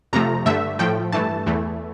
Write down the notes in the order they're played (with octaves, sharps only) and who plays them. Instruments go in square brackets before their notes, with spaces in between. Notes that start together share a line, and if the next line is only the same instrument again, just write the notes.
[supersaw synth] F2 C3 F3 A3 A#5
G2 D3 A3 E5
A2 F3 A3 G5
G2 E3 A3 A5
E2 E3 A3